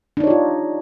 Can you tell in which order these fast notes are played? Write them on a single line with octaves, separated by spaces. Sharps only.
D4 D#4 C#5 G4 F4